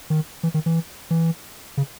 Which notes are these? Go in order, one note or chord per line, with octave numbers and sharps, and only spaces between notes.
D#3
E3
D#3
E3
E3
C#3